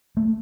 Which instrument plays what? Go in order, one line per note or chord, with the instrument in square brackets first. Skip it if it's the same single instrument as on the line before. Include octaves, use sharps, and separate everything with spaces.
[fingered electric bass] A3